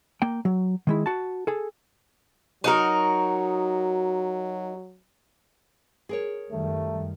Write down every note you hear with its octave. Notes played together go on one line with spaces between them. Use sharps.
A#3 G5
F#3
D#3 G#3 E4
F#4 A5
G#4 A4
F#3 D#4 F#4 A#4
G#4 A#4 C#5
F#2 D#3 G3 A3